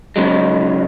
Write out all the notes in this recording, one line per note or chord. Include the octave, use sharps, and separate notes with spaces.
G#2 C#3 F#3 G#3